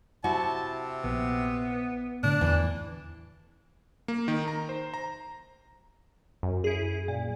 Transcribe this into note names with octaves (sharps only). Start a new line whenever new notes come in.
C3 E4 F#4 A5
A#1 B3
A2 D3 D4
E2 E3
A#3
D#3
A#5
C5
A#5
F#2
E4 G#4
A#2